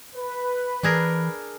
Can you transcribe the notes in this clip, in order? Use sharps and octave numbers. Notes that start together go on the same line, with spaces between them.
B4
E3 D4 G#4 A#4